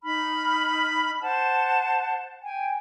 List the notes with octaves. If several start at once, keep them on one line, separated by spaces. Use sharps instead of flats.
D#4 B5 F6
C5 F#5 A5
G5 G#5